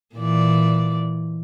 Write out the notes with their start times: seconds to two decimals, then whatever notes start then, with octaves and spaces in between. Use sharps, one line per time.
0.16 A#2 E3 D5